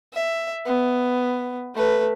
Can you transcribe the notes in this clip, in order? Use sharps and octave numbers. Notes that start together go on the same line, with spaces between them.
E5
B3
A3 B4